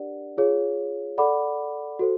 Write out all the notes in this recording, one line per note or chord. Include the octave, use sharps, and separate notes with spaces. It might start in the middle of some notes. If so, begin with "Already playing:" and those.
Already playing: D4 G4 A#4 D5 F#5
F4 G#4 C#5 F5
A4 D5 F#5 B5 D6
F#4 A4 C5